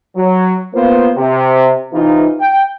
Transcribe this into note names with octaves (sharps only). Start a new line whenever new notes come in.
F#3
A#3 B3 F4 C5
C3
C3 E3 D#4 F4
G5